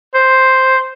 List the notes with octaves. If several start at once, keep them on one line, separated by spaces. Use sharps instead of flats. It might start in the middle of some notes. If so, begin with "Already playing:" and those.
C5